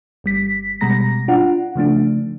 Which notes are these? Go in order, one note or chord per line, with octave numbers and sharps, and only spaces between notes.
G1 G3 B6
B2 G3 G#3 A#5 A#6
D4 F4 F#5
C#3 F3 A3 D4